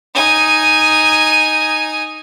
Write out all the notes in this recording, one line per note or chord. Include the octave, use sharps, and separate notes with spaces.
D#4 G#5